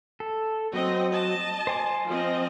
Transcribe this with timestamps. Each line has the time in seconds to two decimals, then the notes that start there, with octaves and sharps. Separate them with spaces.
0.20 A4
0.73 F#3 C4 D#5
1.13 D#5 A5
1.67 C5 G#5 D6
2.06 F3 C4 D#5